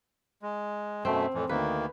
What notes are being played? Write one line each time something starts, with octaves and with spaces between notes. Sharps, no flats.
G#3
F#2 B2 A3 C4
F2 A2 E3
D2 D#3 A#3 B4